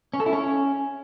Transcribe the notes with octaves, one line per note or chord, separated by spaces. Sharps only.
C#4
A4
E4
C#4